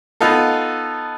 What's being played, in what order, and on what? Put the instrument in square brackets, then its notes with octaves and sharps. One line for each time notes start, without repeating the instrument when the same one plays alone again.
[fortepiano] B3 D#4 F4 A4